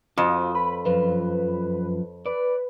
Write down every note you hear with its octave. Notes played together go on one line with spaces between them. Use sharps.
F2 F4 F#4 C5 D#6
B4 B5
F#2 F3 F4 B4
B4 D5